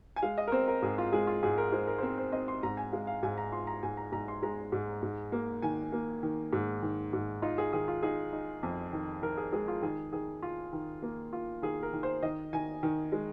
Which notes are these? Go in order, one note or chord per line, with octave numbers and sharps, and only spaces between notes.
G#5
G#3 F5
D#5
A#4
C4 C5
A#4
G#2 G#4
F4
G#3 G#4
F4
G#2 G#4
A#4
G#3 C5
A#4
C5
C4 A#4
C5
C4 D#5
C6
G#2 A#5
G#5
G#3 F5
F5
G#2 G#5
A#5
F4 C6
A#5
G#2 G#5
A#5
G#2 A#5
C6
G#3 A#5
G#2
G#2
A#3
D#3 G#5
A#3
D#3
G#2
D#3
G#2
D#4 F4
G#4
D#3 G#4
F4
D#4 G#4
D#4
F2
D#3
D#3 A#4
G#4
G#3 G#4
F4
D#3 G#4
D#3 G#4
F4
D#3
A#3
F4
D#3 G#4
A#4
D#3
C5
D#3 D#5
D#3 G#5
D#3
G#3